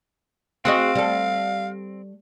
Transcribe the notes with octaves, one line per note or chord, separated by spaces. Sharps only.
C4 F#4 G#4 D#5 F5
G3 A4